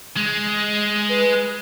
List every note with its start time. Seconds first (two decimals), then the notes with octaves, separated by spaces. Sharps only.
0.17 G#3
1.09 B4